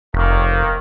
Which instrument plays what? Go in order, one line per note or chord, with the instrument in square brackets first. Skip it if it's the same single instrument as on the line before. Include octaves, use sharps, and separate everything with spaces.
[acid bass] F1 [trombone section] D#3 A#3